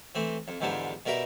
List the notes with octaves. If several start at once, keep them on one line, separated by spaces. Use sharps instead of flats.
E3 A3 C4
F2
E2 G#2 D3 F3 G3 A5
B2 G3 A#4 E5 A#5